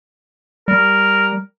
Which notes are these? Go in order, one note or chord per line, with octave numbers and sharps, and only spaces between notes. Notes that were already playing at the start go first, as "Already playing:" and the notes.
G3 A#4